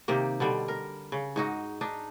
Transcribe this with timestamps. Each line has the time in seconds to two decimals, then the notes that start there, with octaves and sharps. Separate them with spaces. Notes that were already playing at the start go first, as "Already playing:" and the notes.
0.08 C3 D#3 A#3 G4
0.40 B2 D3 G3
0.68 A#4
1.12 C#3
1.36 G#2 D#4 F#4
1.81 D4 D#4